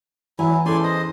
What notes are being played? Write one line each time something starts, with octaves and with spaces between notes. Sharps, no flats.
E3 F#3 E4 G#5
E2 C#4 A4 D5 G#5 C6
C5 D#5